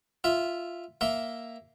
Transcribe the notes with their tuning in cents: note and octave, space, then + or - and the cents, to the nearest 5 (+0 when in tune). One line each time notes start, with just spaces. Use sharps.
F4 -5 E5 +0
A#3 +0 E5 +0 C6 +0